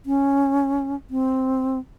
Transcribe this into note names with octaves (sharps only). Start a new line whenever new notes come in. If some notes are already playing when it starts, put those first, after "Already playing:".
C#4
C4